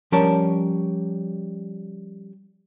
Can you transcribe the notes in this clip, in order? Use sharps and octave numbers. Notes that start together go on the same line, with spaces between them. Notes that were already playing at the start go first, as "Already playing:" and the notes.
F3 G3 C#4 A#4 A5